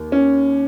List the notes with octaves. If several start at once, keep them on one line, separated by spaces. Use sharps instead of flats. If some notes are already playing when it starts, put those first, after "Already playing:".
Already playing: D#2
C#4